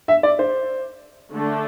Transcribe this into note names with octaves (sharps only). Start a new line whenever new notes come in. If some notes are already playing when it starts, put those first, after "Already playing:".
E5
D5
C5
D3 A3 D4 A4